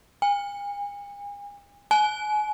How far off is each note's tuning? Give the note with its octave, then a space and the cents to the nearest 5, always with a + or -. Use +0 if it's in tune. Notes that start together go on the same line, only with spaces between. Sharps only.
G#5 -40
G#5 +35